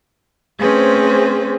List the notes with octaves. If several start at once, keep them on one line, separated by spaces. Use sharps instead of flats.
A3 C4 C#4 G#4 B4 C5